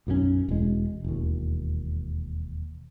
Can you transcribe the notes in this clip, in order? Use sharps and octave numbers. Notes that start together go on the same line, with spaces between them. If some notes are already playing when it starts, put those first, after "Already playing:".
B1 F#2 F3 C#4
E1 G#3
E1 D#2